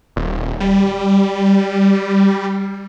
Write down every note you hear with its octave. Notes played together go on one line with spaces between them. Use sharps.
D#1
G3